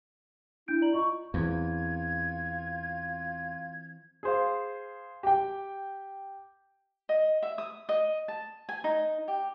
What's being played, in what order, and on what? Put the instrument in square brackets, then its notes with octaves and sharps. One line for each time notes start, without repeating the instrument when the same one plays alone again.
[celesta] D4 G6 D7 [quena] E4
[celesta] D5 A#5 F#7
[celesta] F4 D#5 [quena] C#6
[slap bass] E2 [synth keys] E3 C4 [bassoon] F4 [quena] G#6
[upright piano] G#4 C5 F5
G4 G5
[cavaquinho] D#5
E5
D#6
D#5
A5
G#5
D#4
G4